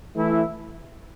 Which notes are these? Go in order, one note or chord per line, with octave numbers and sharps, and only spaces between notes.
E3 A3 E4